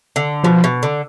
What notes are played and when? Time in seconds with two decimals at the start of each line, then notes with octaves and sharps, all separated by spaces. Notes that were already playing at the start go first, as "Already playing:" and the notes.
0.16 D3
0.43 B2 F3
0.64 B2
0.83 D3